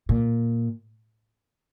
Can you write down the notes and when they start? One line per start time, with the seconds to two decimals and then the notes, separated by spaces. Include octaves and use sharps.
0.09 A#2